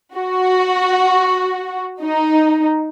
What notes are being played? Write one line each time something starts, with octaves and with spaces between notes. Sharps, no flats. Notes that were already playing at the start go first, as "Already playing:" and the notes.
F#4
D#4